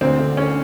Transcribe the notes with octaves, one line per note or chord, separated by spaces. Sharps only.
D2 C4
D3
D3 C#4